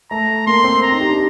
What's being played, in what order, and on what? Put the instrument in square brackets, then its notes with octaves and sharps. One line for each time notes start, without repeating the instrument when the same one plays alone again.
[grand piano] A3 [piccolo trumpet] A#5
[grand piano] A#3 [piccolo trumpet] C6
[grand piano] C4
[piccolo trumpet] A#5
[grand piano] D#4
G4
D4